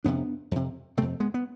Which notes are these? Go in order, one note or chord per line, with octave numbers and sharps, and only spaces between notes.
F2 C3 B3 D4
F2 C3
F2 C3 A3 C4
G#3 B3
B3